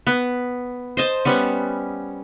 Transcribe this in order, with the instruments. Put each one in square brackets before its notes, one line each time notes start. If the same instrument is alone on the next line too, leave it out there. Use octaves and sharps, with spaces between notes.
[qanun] B3
C5 D#5 A5
G3 B3 C#4